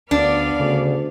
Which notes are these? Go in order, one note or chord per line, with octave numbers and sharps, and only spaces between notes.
D2 B3 D4 D5 F5
D2 C#3